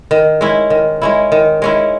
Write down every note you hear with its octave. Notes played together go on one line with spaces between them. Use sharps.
D#3
G#3 C#4 E4
D#3
G#3 C#4 E4
D#3
G#3 C#4 E4